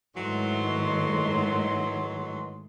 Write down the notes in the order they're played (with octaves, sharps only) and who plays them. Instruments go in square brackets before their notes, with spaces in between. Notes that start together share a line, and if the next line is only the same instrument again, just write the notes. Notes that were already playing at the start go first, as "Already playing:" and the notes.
[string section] G#2 D#3 A3 [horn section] E3 F#3 C6